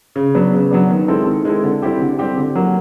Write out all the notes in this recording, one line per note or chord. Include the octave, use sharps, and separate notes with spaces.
C#3
F#3 B3 D4
C#3
F#3 B3 D4
D#3
G#3 C4 E4 A4
D#3
G#3 C4 E4 A4
D3
G3 C4 E4 G4
D3
G3 C4 E4 G4
D3
F#3 A#3